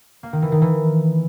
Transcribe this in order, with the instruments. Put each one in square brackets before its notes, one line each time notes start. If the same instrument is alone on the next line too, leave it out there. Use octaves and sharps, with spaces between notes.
[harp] A#3
D#3
E3
D#3
E3